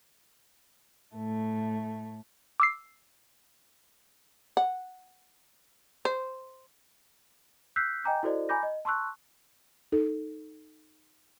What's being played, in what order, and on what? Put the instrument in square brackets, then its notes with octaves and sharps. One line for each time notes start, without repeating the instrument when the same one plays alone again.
[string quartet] A2 A3
[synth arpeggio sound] D6 E6 C7
[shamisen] F#5
C5
[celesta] E6 F#6 G6 B6 C7
D#5 G5 G#5 A#5 D6 G6
E4 F#4 A4 C5 D5 D#5
G#5 A#5 B5 D6 G6 A#6
D#5
A5 C6 C#6 E6 F#6
[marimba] D#4 A4